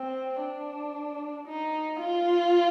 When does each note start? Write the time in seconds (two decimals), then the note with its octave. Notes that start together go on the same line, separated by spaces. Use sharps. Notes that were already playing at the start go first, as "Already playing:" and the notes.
Already playing: C4
0.41 D4
1.47 D#4
2.00 F4